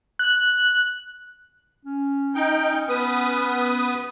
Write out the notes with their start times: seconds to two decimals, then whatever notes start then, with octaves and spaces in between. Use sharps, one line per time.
0.19 F#6
1.86 C#4
2.35 D#4 G5
2.89 B3 B4 D#6